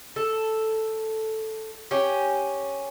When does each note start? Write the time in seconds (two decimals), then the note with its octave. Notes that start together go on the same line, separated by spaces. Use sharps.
0.16 A4
1.91 C#4 G4